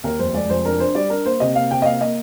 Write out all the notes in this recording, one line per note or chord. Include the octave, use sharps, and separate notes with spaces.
D#2 A#4
F1 C5
G#3 D5
F1 C5
D4 A#4
D4 C5
G3 D5
D4 A#4
A#3 C5
C3 D#5
A#3 F5
C3 G5
D#5
A#3 F5
A#3 D#5